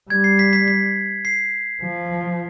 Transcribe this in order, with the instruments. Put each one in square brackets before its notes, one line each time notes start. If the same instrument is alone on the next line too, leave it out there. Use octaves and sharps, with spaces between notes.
[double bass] G3 [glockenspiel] G#6
[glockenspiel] C7
B6
B6
B6
C7
[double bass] F3